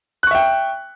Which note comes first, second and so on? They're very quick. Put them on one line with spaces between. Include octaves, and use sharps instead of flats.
F#6 C#6 E5 G5